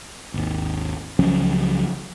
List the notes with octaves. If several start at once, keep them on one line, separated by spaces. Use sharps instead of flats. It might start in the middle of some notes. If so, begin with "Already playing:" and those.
G#1 D#2
C#2 F3 F#3 C#4